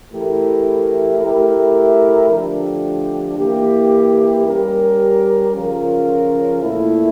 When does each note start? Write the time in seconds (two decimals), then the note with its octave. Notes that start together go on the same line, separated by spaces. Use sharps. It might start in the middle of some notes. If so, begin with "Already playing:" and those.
0.12 E3 A3 E4 G4 A#4
1.21 A3 E4 G4 A#4
2.29 D3 F3 A3 D4 G4
3.38 E3 A#3 E4 G4
4.46 G3 C#4 G4 A#4
5.55 C#3 F3 C#4 F4 A#4
6.62 A#2 A3 E4